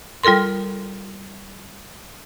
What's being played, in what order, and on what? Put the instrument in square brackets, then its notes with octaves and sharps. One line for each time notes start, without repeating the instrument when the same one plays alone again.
[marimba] G3 F4 A4 A#4 C6